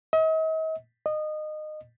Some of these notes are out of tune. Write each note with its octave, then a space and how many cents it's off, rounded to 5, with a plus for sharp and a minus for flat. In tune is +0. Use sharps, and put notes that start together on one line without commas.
D#5 +40
D#5 -25